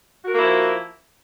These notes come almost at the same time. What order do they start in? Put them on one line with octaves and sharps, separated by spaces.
F#4 A#4 A#3 E4 F3